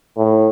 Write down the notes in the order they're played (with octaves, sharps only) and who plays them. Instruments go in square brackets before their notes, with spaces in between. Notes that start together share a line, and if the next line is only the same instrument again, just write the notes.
[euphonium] A2